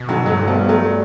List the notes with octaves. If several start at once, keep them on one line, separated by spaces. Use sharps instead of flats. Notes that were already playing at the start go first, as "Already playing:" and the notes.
Already playing: B2
D3 F#3
G2 F#3 A3
G3 B3
F#3 A3